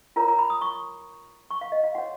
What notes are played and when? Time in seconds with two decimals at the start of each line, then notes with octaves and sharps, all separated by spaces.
0.16 F4 A#4 C#5 A#5
0.28 A#5
0.39 B5
0.50 D#6
0.61 C#6
1.51 C#6
1.61 F5
1.72 D#5
1.83 F5
1.95 F#4 C#5 F#5